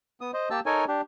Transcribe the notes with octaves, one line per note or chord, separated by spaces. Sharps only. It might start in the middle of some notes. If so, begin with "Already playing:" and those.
B3 D#6
C5 D#5
A#3 G4 A5 E6
D#4 A4 A#4 C#5 G#5
D4 G4